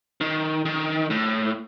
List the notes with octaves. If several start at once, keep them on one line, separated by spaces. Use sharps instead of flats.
D#3
D#3
A2